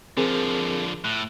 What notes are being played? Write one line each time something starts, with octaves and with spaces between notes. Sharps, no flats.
D3 F3 C4 G#4 A#4
A2 F#6